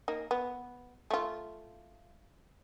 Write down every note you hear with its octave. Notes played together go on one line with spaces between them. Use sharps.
A#3 D#4
B3
A3 F4